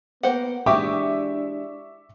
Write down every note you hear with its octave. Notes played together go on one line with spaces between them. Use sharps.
A#3 B3 C5 F#5
E3 G#3 D4 G4 E5 C#6 D6